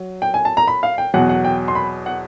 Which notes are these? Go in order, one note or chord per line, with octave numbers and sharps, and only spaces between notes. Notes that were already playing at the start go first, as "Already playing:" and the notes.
Already playing: F#3
G5
G#5
A5
A#5
B5
F5
G5
E2 B2 F#3 F#5
F#5
G5
C6
B5
F#5